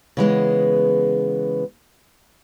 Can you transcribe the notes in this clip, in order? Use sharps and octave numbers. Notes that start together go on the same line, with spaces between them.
C#3 E3 G#3 B3